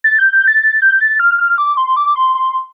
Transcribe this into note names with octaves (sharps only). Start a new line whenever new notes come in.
A6
G6
G6
A6
A6
G6
A6
F6
F6
D6
C6
D6
C6
C6